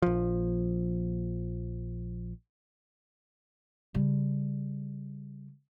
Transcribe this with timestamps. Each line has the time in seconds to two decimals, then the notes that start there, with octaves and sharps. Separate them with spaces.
0.02 A#1 F3
3.94 C#3 G3